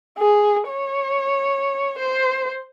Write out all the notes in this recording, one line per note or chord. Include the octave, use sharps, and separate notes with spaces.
G#4
C#5
C5